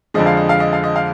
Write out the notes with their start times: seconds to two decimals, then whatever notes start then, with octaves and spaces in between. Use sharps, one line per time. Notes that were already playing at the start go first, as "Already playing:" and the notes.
0.14 F2 D3 F3 G#3 D#5
0.26 F5
0.37 D#5
0.49 F5
0.60 D#5
0.73 F5
0.84 D#5
0.96 F5